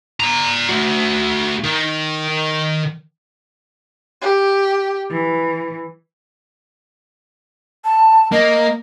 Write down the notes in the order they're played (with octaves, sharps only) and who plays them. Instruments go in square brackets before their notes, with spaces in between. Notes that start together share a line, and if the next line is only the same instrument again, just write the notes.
[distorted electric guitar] D5 A#5
A3 F#4
D#3
[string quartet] G4
E3
[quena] A5
[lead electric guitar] A#3 [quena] D#5